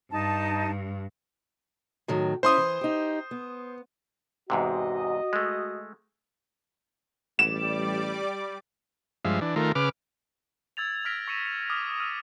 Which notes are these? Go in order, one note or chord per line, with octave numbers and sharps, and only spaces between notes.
G2 D#4 A5
A2 D#3 F#3
C#4 E4 C5 C6 D#6
E3
D#4 G4
B3
E2 G#2 C3 F#4 D#5
G#3 A3
A1 G3 D5 D6 E7
G2 F3 G#3 E5 F5
E3 D4
D#3 A3 F4 A#4
C#3 B4 D6 F6
E6 G#6 A6 F7
E6 F6 A#6 B6 D7
C#6 E6 C#7 D#7 E7
C#7 F7
D6 D#6 F6
E6 F6 D#7